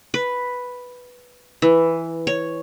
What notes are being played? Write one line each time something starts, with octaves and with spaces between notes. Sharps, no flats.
B4
E3
C#5